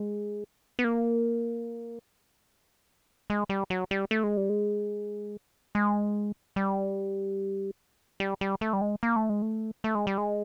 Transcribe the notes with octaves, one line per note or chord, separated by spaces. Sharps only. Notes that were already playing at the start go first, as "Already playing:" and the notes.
Already playing: G#3
B3
A#3
G#3
G3
F#3
G3
A3
G#3
G3
G#3
G#3
G3
G3
G3
A3
G3
G#3
A#3
A3
G#3
A3
A3
G#3
G3
G#3